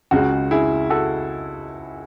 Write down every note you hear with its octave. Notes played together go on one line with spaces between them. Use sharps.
C#2 C#3 G#3 F#4
E4 G#4
F#4 A4